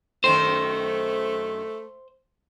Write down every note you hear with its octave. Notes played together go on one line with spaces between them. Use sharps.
F#2 D#3 A3 C4 C5